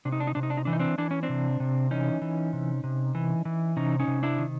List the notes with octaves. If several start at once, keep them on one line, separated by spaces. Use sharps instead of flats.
C3 D4
D#4
D4
D#4
C3 D4
D#4
D4
D#4
E3 D4
D#4
C4 D4
E3 D4
C#4
C4 D4
C3
C3
E3 C#4 D#4
E3
C3
C3
E3
E3
C3 C#4 D#4
C#4 D#4
C3
D4 E4
D#3